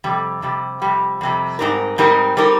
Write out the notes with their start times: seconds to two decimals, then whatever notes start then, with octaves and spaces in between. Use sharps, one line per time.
0.04 F2 C3 G3
0.42 F2 C3 G3
0.82 F2 C3 G3
1.21 F2 C3 G3
1.59 G#2 G3 C4 D#4 A#4
1.98 G#2 G3 C4 D#4 A#4
2.37 G3 C4 D#4 A#4